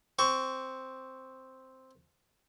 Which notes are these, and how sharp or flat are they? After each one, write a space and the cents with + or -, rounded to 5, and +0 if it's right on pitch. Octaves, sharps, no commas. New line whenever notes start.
C4 +0 C#6 +15